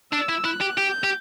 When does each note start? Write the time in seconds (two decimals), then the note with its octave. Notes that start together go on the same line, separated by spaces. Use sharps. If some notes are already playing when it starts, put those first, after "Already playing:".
0.12 D4 E6
0.29 E4
0.45 E4 F#6
0.61 G4
0.78 G4 G6
1.04 G4